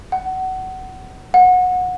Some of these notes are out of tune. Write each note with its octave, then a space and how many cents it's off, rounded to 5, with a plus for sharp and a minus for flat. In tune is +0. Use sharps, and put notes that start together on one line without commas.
F#5 +25
F#5 -20